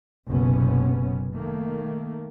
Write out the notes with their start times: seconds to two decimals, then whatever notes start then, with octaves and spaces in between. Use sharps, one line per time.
0.29 F#1 B1 C3 B3 C#4
1.34 D#3 A3 A#3